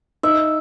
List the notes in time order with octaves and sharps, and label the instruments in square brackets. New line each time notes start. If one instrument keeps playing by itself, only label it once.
[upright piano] D#4 [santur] E5